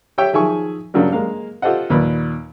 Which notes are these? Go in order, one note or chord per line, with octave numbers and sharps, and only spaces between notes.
G4 C#5 E5 G5
D#3 F3 G#4 E5 G#5 C#6
G2 C#3 F#3 G3 A#3
G#3 A#3 F5
F4 G4 A4 C5 D#5 F#5
D#2 A#2 B4 B5